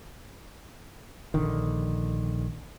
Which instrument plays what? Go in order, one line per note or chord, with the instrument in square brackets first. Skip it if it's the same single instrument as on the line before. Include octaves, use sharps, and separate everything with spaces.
[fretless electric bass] A#1 D3 D#3